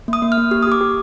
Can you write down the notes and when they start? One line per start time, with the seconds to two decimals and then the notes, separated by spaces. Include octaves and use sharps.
0.08 A#3
0.13 D#6
0.22 A#3
0.32 F6
0.37 A#3
0.51 G4 F6
0.63 D#6
0.67 G4 D6
0.81 G4